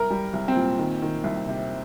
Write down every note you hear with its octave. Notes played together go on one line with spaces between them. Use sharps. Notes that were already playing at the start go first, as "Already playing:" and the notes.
Already playing: C2 A#4
G3
C2
C4
A#2
D#3
D#3
C2
C3